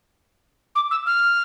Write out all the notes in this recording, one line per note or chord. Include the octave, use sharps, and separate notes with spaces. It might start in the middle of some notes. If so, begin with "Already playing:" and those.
D6
E6
F6